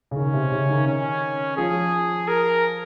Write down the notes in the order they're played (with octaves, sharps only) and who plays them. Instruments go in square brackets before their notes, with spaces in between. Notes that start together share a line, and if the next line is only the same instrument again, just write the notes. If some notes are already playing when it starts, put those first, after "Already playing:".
[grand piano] C#3
[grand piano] D#3 [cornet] C#4
[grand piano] C3
C#3
D#3
[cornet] C#4
[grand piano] F3 [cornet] G#4
[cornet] A#4